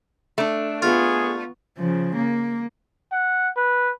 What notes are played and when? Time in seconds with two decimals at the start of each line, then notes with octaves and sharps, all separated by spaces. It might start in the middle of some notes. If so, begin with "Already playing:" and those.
0.38 A3 D4
0.82 B3 F4 G#4 C#6
1.78 C#3 F3
2.16 A#3
3.12 F#5
3.57 B4